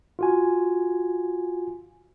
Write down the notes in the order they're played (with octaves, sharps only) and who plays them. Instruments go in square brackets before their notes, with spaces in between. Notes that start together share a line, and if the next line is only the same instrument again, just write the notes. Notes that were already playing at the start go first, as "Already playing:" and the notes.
[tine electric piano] F4 F#4 G#5